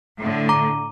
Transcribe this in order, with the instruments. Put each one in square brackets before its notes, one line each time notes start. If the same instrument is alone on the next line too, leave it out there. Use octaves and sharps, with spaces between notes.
[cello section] A2 D3
[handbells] A#5 D6